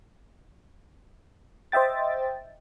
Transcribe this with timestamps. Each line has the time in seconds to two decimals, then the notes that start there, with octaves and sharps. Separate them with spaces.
1.72 C5 D#5 E5 G5 A6